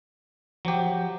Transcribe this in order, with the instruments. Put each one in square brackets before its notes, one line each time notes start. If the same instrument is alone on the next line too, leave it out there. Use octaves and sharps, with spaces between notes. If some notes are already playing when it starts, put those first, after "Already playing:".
[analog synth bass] F3 [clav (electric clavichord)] F#3 G4